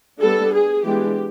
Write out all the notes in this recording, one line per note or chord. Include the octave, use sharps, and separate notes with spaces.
G3 B3 D4 A4
G#4
E3 G#3 B3 D4 G4